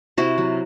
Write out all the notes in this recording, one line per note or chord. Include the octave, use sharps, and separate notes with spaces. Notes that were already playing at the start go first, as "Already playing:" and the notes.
C3 E4 F#4
F#3